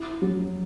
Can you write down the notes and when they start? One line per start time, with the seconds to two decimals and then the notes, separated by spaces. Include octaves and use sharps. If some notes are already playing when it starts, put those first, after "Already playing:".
Already playing: E4
0.22 F#3